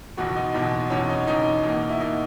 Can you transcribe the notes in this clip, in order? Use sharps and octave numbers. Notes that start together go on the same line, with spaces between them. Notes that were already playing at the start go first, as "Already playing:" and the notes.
F#1 E2 B2 F#4
D#4
F#1 E2 B2
F#1 E2 B2 C#4
D#4
F#1 E2 B2 D#4
E2 B2 A#3
E4
B2 A#3 D#4